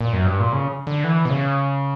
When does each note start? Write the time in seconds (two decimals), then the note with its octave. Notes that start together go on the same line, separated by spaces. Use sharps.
0.01 A#2
0.13 F#2
0.26 G2
0.40 A#2
0.52 C#3
0.87 D3
1.04 E3
1.25 B2
1.30 C#3